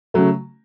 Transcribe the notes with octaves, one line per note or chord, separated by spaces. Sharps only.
C#3 F#3 A3